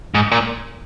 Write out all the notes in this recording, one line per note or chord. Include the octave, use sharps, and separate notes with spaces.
G#2
A#2